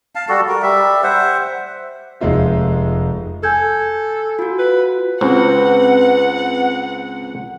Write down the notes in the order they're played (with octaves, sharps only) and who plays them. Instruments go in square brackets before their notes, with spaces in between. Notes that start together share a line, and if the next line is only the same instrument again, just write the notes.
[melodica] F5 A5
G3 F#4 A4
A#4
G3 E5
C5 E5 F#5
[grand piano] F1 G#3 D#4 F4 E5
[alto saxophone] A4 [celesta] G#5 G6 G#6
[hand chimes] F4 F#4
[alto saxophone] B4
[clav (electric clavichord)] C#2 [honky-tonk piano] C4 [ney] B4 [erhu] F#5